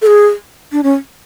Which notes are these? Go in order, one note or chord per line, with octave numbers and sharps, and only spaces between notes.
A4
G#4
D4
C#4